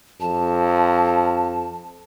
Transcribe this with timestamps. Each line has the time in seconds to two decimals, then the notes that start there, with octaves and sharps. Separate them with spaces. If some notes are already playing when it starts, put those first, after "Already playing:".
0.20 F2 A5